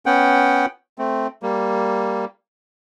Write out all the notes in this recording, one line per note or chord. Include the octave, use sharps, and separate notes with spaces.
B3 C#4 F#5 G5
A3 C4
G3 A#3